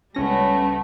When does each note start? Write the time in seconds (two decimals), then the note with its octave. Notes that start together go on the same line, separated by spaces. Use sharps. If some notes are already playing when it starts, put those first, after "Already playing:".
0.15 C#2 G3 A3 B3 C#4 A#6